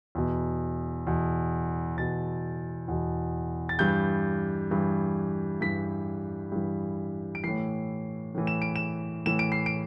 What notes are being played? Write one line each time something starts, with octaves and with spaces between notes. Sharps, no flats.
E2 B2
E2 B2
E2 B2 A6
E2 B2
A6
G2 E3 G6
G2 E3
G2 E3 B6
G2 E3
D7
A2 E3 C7
A2 E3
E7
D7
E7
A2 E3 E7
D7
C7
D7